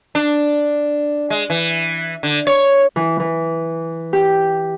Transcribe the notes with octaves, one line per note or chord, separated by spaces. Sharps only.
D4
G#3
E3
D3
C#5
E3
E3
G4